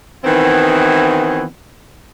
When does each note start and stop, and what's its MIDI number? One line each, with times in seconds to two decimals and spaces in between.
0.24 1.45 51
0.24 1.45 52
0.24 1.45 59
0.24 1.45 60
0.24 1.45 64
0.24 1.45 66